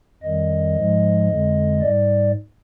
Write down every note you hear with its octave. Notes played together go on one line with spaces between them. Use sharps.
F2 D#3 G3 D#5
G#2 F3 G#3
F2 D3 G#3
G#2 G3 D5